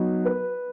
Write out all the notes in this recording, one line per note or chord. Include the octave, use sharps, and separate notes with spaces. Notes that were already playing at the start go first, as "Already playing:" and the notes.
Already playing: F#3 B3 D#4
B4